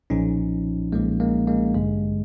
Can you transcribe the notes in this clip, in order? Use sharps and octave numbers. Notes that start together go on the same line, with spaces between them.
B1 A#2 F3 C#4 D#4
B1 A#2 F3 G#3 A#3
G#3 A#3
G#3 A#3
A1 G2 D3 G#3